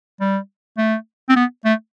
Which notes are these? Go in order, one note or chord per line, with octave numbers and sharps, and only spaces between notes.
G3
A3
C4
B3
A3